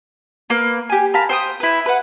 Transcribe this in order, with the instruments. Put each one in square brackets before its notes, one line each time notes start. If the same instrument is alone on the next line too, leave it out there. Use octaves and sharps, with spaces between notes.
[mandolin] A#3 B4
G4 G#5
A#4 F5 A5 B5
C5 G5 D#6
E4 B4
B4 F#5